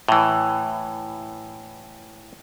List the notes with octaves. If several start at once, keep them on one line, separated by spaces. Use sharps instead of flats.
A2 E3